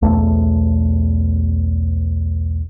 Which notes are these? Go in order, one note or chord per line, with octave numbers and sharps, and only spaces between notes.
B1 E2 A3